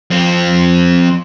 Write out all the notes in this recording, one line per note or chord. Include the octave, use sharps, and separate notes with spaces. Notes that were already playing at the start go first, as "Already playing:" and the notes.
F2 C4